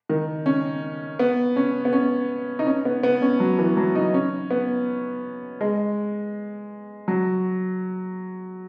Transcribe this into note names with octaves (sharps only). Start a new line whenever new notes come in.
D#3
C#4
B3
C#4
B3
C#4
D#4
C#4
B3
B3
C#4
F#3
E3
F#3
D#4
C#4
B3
G#3
F#3